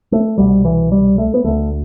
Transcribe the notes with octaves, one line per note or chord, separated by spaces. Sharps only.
A3
C2 B2 G3
E3
G3
A3
B3
D2 D3 A3